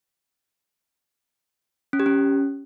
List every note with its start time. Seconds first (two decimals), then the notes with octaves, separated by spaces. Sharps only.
1.93 C#4
2.00 G4
2.06 C#4